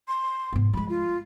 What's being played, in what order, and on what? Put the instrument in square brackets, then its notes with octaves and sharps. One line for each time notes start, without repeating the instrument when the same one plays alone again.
[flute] C6
[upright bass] G#2 B3
[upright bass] F3 G#3 [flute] B5
[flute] F4